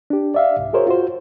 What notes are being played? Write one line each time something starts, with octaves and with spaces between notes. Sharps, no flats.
D4 G4
D5 E5 F5
C2 G#2
F#4 G#4 A#4 C5 C#5
F4 F#4 C5